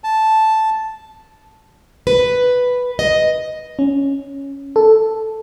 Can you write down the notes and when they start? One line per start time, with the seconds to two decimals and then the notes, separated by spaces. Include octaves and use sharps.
0.04 A5
2.07 B4
2.99 D#5
3.79 C#4
4.76 A4